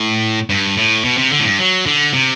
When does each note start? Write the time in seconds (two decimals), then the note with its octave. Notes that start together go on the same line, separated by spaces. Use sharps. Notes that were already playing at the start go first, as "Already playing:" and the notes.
Already playing: A2
0.50 G2
0.77 A2
1.04 B2
1.18 C3
1.31 D3
1.39 A2
1.45 G2
1.59 F#3
1.86 D3
2.13 C3